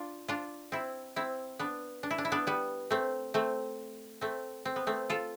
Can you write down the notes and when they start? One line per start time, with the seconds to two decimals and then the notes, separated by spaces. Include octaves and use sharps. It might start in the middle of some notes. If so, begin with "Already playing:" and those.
Already playing: D4 F4
0.28 D4 F4
0.72 C4 E4
1.16 C4 E4
1.59 B3 D4
2.03 D4
2.11 E4
2.18 D4
2.25 E4
2.32 B3 D4
2.47 G3 B3
2.91 A3 C4
3.34 A3 C4
4.21 A3 C4
4.65 C4
4.76 B3
4.87 A3 C4
5.10 F4 A4